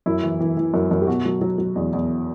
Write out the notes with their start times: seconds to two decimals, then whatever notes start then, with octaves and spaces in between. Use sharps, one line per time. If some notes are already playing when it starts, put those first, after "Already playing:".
0.06 F#2 E4
0.23 E3
0.40 E3
0.57 E3
0.74 F#2
0.91 F#2
1.01 G4
1.07 B2 F#4
1.25 F#3
1.41 F#3
1.58 F#3
1.75 E2
1.93 E2